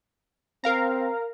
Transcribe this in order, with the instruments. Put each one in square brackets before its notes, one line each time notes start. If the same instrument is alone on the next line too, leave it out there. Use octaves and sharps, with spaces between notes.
[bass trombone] C4 [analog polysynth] A#4 F5 A#5